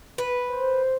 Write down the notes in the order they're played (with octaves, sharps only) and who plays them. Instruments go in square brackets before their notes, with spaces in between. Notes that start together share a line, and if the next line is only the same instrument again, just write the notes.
[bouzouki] B4
[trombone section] C5